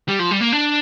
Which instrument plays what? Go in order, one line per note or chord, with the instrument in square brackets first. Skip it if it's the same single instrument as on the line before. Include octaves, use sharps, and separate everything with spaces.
[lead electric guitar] G3
F3
G3
A#3
D4